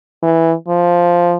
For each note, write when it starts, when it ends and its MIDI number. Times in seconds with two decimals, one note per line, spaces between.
0.23 0.54 52
0.68 1.37 53